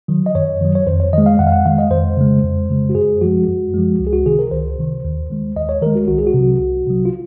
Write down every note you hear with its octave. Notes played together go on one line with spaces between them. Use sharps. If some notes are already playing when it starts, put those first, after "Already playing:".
D#3 F#3
D#5
F#2 C#5
D#3 F#3
C#5
F2 C5
C#5
D#3 G#3 D#5
F5
F2 F#5
F5
F#5
D#3 G#3 F5
D#5
F2 C5
C#3 G#3
F2
C#3 G#3
F#4
F#2 G#4
F3 G#3 F#4
F#2
F3 G#3
C#2
G#4
F#4
C3 D#3 G#4
A#4
C#2 C5
C3 D#3
D#2
D#3 G#3
D#2 D#5
C#5
D#3 G#3 A#4
F#4
C2 F#4
G#4
F#4
C3 F#3
C2
C3 F#3
F4